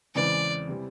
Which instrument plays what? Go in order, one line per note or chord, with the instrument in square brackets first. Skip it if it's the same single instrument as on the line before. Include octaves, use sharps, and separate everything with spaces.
[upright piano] E2 C#3 E3 G#3 C4 [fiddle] D5
[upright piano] C3 E3 G3 C4